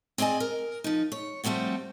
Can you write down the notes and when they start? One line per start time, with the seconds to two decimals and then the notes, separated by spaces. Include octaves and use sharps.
0.18 C4 G#4 D5 D#5 G#5
0.40 A#4
0.84 F3 D#4
1.12 C#5
1.44 F3 G3 A3 C4 F#4